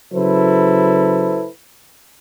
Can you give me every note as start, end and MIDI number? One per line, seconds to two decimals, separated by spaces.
0.13 1.47 49
0.13 1.47 54
0.13 1.47 64
0.13 1.47 69
0.13 1.47 71
0.13 1.47 72